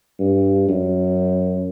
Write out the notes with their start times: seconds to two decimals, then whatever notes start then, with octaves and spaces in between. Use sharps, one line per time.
0.20 G2
0.69 F#2